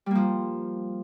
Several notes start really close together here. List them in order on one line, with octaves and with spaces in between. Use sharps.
G3 A#3 F3